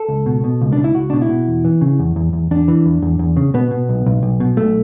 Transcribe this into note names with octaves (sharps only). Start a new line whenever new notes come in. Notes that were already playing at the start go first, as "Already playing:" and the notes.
Already playing: A4
C#2
B2
B2
C#2
C#2 D4
E4
C#2 F#4
B2 D4
E4
B2
E2
E3
C#3
E2
E2
E2
E2 D4
E3
E2
E2
E2
C#3
B2 B3
B2
B1
B1
B1
B2
B1 A3